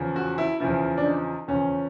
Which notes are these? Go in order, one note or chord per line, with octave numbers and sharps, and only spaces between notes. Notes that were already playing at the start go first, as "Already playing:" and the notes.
Already playing: E2 C#3 F3
F#4
E4
E2 C#3 F3 E4
D4
D#4
E2 C#3 F3 C#4